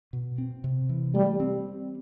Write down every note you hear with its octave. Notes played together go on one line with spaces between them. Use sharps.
B2
C4
C3
E3
G3 A3
C4